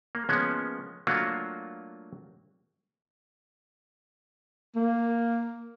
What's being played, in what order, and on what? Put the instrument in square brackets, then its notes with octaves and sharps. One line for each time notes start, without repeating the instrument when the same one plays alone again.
[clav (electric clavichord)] A#3
F3 G#3 A#3 B3 C#4
F#3 A3 A#3 D4 F4 F#4
[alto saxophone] A#3